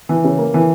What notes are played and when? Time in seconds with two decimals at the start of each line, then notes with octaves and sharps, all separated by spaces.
0.09 E3
0.24 C#3
0.38 A#3
0.54 E3